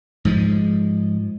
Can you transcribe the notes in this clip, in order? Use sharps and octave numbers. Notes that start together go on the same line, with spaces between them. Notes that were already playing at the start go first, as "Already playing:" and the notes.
G#2 F3 G#3